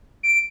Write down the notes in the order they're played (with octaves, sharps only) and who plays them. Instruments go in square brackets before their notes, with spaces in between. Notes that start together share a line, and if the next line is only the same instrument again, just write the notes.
[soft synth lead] D7